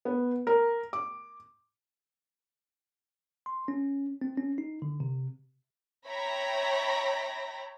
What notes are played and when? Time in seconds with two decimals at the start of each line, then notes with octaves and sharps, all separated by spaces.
0.05 B3
0.47 A#4
0.93 D6
3.46 C6
3.68 C#4
4.21 C4
4.37 C#4
4.58 D#4
4.82 D3
5.00 C3
6.07 C#5 E5 G5 A#5 B5 A#6